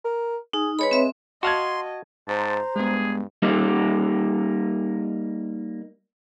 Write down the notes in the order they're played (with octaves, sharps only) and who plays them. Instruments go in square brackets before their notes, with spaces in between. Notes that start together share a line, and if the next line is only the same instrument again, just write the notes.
[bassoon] A#4
[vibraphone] D#4 [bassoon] G#4
[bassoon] G#3 [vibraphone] B4 C#5 B5
[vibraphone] C4 E5
[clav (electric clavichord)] F#4 F5 F#5 [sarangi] D#5 [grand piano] A5 G#6 [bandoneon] C6
[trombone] G#2 [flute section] C5 A#5 [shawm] A5
[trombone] G2 [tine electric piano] G#3 B3 [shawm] G#4
[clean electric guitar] G3 A#3 D#4